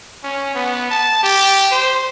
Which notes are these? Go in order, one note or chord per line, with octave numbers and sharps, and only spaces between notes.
C#4
B3
A5
G4
C5